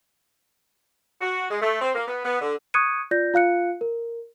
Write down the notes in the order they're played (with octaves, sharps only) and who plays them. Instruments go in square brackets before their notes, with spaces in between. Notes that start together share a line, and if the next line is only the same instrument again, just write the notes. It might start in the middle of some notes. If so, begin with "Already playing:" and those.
[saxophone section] F#4
G#3
A3
C4
A#3
B3
B3
D3
[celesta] C#6 D#6 F#6 G#6 C#7 D#7
F4 D5 G6 A#6
F4 F5 F#6 C#7
A#4